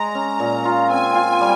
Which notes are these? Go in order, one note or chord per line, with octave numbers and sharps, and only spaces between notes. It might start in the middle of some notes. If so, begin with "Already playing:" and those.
Already playing: G#3 A#5
C#4
A#2
F4
C4 G#5
F4
G3